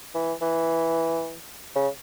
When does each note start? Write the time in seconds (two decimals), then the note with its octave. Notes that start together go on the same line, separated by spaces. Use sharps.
0.14 E3
0.41 E3
1.75 C#3